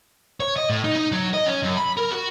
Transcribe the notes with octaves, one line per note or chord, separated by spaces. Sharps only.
C#5
D#5
A2
D#4
D#4
F#3
D#5
C#4
F#2
B5
A#4
F#4